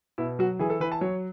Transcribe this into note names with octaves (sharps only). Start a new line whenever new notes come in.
B2 E4
F#3 F#4
E3 G#4
A4
E3 B4
A5
F#3 C#5